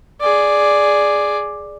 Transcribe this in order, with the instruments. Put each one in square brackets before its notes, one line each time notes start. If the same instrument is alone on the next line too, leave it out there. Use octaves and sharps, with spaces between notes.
[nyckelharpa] G#4 D5